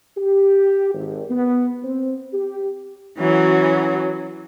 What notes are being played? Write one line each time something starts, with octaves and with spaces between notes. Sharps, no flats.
G4
G#1
B3
C4
G4
E3 F#3 C#4 F#4